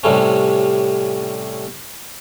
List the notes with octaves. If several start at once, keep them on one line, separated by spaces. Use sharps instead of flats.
A2 C3 G3 A3 C#4